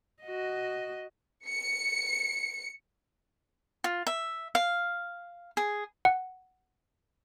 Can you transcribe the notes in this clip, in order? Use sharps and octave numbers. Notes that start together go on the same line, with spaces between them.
F#4 D#5
C#7
F4
E5
F5
G#4
F#5